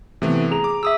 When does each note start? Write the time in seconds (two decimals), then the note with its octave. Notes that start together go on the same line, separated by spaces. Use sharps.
0.22 C3 E3 A3 B3
0.51 G#4 A#5 F7
0.64 D6
0.83 G#4 E5 D#6 E6